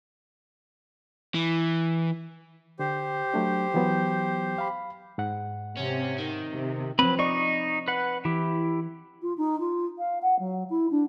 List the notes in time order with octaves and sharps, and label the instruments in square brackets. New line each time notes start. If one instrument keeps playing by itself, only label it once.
[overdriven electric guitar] E3
[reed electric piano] D3 [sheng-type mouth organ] G4 C5
[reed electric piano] F#3 A3 D4
E3 F#3 B3
F5 B5
G#2 F#5
[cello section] C3 [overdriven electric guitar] C#4
[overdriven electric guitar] D#3
[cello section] C3
[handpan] F3 C4 [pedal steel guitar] F#3 B4 B5
[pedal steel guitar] D#4 C#6 [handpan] D5 D#5
[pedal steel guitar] B4 F#5
[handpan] E3 [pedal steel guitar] E4 G4
[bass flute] F4
D#4
F4
F5
F#5
F#3
E4
D4